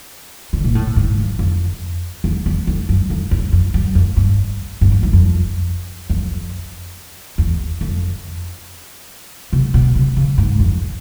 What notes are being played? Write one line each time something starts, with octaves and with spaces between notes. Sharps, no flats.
D3
A#2
A2
G#2
G2
F2
E2
E2
F2
F#2
F2
E2
F2
F#2
F2
G2
G#2
G2
G2
F2
F2
E2
F2
C3
B2
C3
C#3
G#2
F2